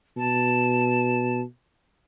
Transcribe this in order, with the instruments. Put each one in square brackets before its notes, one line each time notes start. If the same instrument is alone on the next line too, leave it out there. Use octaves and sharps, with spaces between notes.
[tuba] B2 [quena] A5